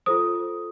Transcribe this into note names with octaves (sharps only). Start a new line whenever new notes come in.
F4 A4 C5 D#6